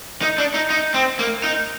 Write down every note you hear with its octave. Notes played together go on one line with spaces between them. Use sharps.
D#4
D4
D#4
D#4
C4
A#3
D#4